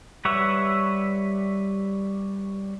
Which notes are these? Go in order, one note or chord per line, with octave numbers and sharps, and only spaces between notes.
G3 B4 C#5 E5 F#5